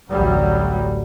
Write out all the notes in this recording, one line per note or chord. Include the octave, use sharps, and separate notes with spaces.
A1 D2 F#3 G3